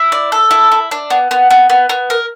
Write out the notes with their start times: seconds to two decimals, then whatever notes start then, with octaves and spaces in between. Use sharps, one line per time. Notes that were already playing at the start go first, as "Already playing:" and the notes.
Already playing: E4
0.12 D5
0.32 A4
0.51 E4
0.72 E4
0.91 D4
1.10 B3
1.31 B3
1.51 B3
1.70 B3
1.89 B3
2.10 A#4